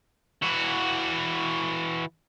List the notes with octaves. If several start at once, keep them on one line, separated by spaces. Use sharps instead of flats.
E3 F#4